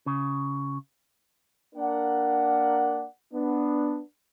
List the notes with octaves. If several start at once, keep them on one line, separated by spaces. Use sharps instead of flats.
C#3
A#3 D4 A#4 F#5
B3 D4